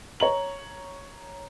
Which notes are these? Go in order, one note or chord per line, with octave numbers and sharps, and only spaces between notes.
C#5 A#5 F#7